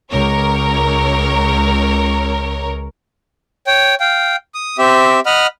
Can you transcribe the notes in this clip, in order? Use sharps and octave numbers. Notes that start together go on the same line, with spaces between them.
C#2 A#4 C#5
C#5 G5
F5 G5
D#6
C4 G4 E5
D#5 F#5 B5 F6